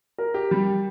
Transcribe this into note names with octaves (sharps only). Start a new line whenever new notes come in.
A#4
G4
G3